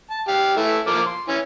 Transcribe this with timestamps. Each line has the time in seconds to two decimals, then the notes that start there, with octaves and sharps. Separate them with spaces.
0.10 A5
0.28 G4 F5
0.57 E3 A3 E4
0.87 F3 A#3 D6
1.06 C6
1.28 E3 C#4